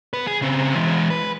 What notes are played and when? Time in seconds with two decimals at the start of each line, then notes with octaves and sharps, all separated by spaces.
0.13 B3 B4
0.27 G#4
0.42 C#3 C4
0.75 E3 G#3
1.10 B4